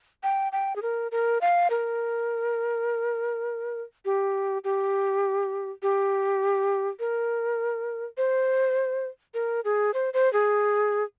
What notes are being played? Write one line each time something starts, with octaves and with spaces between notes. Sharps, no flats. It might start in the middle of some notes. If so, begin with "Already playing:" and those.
G5
G5
G#4
A#4
A#4
F5
A#4
G4
G4
G4
A#4
C5
A#4
G#4
C5
C5
G#4